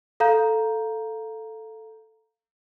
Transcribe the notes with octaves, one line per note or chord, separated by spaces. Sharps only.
A4 F5 A#5 G6